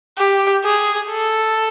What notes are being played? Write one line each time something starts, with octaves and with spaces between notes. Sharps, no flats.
G4
G#4
A4